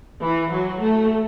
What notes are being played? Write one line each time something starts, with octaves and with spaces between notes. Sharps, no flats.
E3
F#3
A3